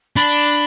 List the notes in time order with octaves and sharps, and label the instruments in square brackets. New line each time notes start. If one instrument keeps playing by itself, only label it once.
[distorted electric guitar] D4 [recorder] B5